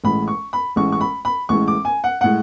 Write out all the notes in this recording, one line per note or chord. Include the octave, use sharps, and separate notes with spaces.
A1 A2 G#3 B5
C#6
B5
A1 A2 G#3 C#6
C#6
B5
B5
A1 A2 G#3 C#6
D6
G#5
F#5
A2 G#3 F#5